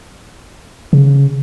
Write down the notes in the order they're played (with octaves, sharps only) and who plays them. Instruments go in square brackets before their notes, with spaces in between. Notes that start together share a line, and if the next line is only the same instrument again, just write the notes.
[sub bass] C#3